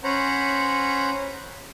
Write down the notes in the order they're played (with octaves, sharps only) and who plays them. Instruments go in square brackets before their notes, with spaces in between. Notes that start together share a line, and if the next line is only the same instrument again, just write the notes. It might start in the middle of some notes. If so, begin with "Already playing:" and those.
[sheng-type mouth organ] C#4 C5 C#5 F#5 A#5 B5